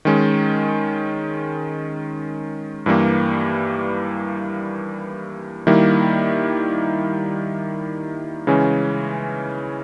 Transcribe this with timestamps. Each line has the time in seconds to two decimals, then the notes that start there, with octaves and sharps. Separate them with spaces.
0.05 D#3 G#3 C#4
2.86 G2 E3 G3 A#3
5.67 D#3 G3 A#3 E4
8.47 C#3 E3 G#3 C#4